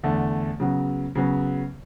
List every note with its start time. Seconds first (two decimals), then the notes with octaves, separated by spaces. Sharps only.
0.03 E2 D3 A3
0.60 C#3 F#3 B3
1.15 C#3 F#3 B3